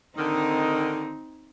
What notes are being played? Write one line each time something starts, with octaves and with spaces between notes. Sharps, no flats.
D3 D#3 C4 D#4